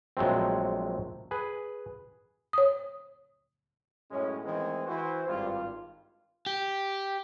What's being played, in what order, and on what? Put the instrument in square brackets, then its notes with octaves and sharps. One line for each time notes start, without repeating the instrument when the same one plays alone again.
[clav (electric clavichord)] A#1 F#3 G#3 A3 C4
G#4 B4
[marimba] C#5 D#6
[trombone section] F#2 A2 G#3 C#4
D#3 E3 G#3 A3 B3 C4
E3 E4 F#4 C5
G#1 G2 F4
[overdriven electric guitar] G4